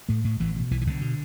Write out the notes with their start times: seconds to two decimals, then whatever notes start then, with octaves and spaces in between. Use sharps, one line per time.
0.09 A2 A3
0.24 A2
0.40 A1 E3
0.56 B2
0.71 B1 E3
0.81 E3
0.87 B1 D3
1.01 B2